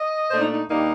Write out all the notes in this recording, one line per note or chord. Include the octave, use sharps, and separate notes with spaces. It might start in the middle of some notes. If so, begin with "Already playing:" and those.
Already playing: D#5
A#2 A3 D4 C5
D#4
D#4
D#2 D#3 G3 A#3 D4 D#4